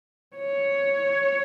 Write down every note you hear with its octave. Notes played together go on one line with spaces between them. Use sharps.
C#5